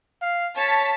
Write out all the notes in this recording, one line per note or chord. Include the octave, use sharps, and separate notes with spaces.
F5
C#5 A5 B6